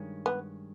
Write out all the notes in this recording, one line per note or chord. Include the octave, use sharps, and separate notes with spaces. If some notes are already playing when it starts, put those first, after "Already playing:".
Already playing: G2 D#3 G#3 C#4
B3